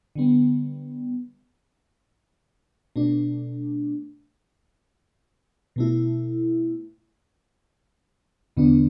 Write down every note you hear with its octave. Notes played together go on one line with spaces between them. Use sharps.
D3 G3 B3
B2 A3 D4
B2 A3 E4
E2 D3 B3 D4